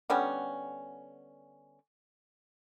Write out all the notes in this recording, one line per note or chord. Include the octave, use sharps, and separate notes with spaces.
D3 G3 B3 C#4